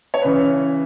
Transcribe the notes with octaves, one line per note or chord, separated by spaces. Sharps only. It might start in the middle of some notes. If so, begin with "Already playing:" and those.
C#5
C#3 E3 B4